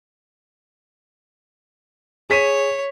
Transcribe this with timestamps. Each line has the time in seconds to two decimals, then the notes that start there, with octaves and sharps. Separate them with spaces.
2.30 G#4 C#5 B6 D#7